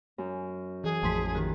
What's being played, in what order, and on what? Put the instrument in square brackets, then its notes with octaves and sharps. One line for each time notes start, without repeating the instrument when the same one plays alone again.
[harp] F#2
[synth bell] E3 [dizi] G#4
[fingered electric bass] A1 F2 [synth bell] A5 C6 B6
[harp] D#3 [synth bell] G4